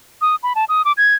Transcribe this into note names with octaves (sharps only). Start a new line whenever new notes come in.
D#6
B5
A5
D#6
D6
G#6